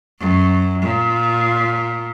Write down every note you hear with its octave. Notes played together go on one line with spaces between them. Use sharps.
F#2
A#2